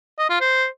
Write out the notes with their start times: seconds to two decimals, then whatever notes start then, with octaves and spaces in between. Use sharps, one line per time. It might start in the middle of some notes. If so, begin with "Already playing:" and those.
0.19 D#5
0.30 F4
0.41 C5